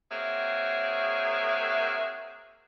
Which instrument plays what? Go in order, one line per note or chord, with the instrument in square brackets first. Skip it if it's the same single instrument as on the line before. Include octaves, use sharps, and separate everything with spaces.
[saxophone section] A#3 C4 F#4 G#4 C#5 E5